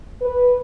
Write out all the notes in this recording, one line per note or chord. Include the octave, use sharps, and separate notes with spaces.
B4